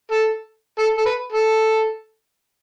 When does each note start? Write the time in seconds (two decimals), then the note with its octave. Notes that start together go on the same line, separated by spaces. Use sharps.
0.12 A4
0.79 A4
0.98 A4
1.06 B4
1.33 A4